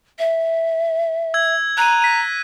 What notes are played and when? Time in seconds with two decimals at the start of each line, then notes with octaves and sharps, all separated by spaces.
0.19 E5
1.34 E6 G#6
1.78 A#5 F#6 D#7
2.02 A#6 B6 D#7